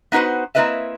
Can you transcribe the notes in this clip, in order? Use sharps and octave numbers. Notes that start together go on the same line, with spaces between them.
B3 D#4 F#4 B4 C5
A#3 C4 E4 B4 D#5 E5